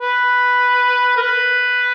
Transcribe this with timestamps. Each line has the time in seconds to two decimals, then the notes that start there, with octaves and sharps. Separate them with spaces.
0.01 B4
1.17 A#4
1.22 B4